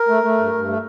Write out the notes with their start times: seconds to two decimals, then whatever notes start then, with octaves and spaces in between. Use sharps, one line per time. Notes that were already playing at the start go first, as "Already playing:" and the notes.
Already playing: A#4
0.08 A3
0.23 A3
0.38 G2
0.53 G2
0.67 A3